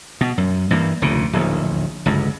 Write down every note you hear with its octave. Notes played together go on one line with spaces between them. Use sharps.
B2
F#2
G2 E3 A#3
F1 D2 A#2 C#3
D1 A#1 D#2
G1 C#2 F#2